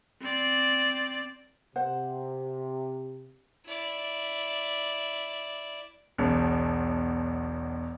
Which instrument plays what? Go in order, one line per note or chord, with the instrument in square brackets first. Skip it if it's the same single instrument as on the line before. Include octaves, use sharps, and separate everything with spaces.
[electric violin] C4 D5
[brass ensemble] C3 [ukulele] C5 F#5
[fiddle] E4 D5
[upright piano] E1 B1